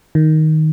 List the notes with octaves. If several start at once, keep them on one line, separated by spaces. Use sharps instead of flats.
D#3